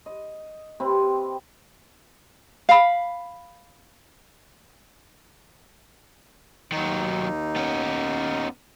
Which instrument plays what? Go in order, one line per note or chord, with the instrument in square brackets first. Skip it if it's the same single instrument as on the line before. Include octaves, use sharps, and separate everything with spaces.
[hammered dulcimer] D#5
C3 C4 B4 C6
[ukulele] F5 B5
[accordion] D#2 D#4 [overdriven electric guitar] D#3 F#3
[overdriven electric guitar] B3 C#4